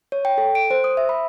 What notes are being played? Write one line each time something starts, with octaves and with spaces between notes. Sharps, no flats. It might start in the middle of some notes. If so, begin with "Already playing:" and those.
C#5
G5
A4
D7
C5
D#6
E5
B5